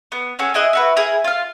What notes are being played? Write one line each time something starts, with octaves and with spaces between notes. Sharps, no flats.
B3
C#4 F#4 G#4 A4
E4 G#4 D#5 F#5
E4 F#4 B4
E4 G#4 A#4
F4 F5